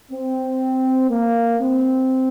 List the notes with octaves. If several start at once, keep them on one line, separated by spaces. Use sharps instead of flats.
C4
A#3
C4